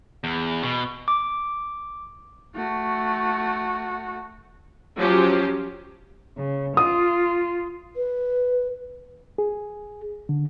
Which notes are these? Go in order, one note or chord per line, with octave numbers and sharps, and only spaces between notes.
E2
B2
D6
A3 F#4
F3 F#3 C#4 G4 C5
C#3
F4 D#6
B4
G#4
D3